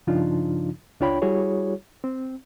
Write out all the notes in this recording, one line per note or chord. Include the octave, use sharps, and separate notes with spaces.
G2 C#3 F3 D4 D#4 F4
C#2 D4 F4 C#5 G5 B5
G3 E4 F#4 G#4 C#5
C4